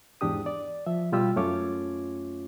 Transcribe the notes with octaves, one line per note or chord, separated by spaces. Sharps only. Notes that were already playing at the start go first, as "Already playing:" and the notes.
E2 G#2 D4 G4 D#6
D5
F3 E5
B2 G3 F4 G4 E6
F#2 A3 C#4 F4 C#5 D6